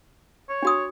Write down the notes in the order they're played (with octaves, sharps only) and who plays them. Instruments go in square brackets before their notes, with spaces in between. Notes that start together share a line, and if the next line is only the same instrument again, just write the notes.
[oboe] C#5
[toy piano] D4 F#4 D#6